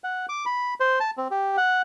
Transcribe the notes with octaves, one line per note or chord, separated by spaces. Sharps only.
F#5
D6
B5
C5
A5
C4
G4
F#5